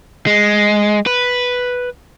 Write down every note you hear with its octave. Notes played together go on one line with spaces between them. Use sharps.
G#3
B4